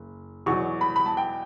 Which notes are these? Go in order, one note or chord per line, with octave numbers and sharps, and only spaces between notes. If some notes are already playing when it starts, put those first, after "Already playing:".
Already playing: F#1
E2 B2 F#3 C#6
B5
B5
A5
G5